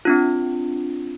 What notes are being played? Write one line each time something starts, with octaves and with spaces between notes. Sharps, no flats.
C4 D4 F4